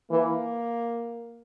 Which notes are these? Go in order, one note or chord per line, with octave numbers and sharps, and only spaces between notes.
E3 A#3